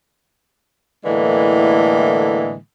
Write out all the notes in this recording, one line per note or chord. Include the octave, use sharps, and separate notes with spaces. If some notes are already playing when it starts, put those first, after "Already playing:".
A2 D3 E3 G#3 A#3